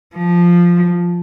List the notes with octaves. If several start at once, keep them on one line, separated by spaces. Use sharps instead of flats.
F3